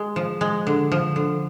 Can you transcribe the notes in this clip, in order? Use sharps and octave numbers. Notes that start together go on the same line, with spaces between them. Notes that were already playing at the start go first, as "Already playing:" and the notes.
Already playing: G#3
F3
G#3
D3
F3
D3